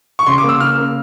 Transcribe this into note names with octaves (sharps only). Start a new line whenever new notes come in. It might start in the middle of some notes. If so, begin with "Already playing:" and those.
C#6
C#3 C6
D6
A#3
E6
C#3 F6
A#3